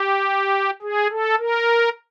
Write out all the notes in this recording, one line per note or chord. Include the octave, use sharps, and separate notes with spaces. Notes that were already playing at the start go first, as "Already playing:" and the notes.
Already playing: G4
G#4
A4
A#4